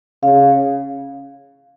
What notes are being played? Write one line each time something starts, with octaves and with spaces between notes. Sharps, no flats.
C#3 F5